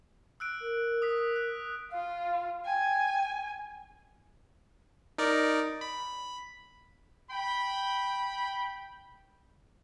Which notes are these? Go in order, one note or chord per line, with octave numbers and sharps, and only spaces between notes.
E6 F#6 D7
A#4
D#6 B6
F#6
F4 F5
G5 G#5
D#4 A#4 D5
B5
G5 B5